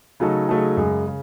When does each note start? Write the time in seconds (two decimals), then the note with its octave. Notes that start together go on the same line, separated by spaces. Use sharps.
0.20 C#3 F#3 A3 D#4 A4
0.49 C#3 F#3 A3 D#4 A4
0.77 F#2 C#3 G#3
1.07 C#3